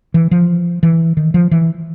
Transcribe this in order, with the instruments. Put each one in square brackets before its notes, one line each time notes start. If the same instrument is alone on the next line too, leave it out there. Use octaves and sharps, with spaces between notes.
[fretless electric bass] E3
F3
E3
D#3
F3
E3